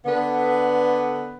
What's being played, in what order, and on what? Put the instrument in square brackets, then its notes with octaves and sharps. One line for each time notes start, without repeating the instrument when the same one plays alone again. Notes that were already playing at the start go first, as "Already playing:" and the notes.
[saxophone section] D3 B3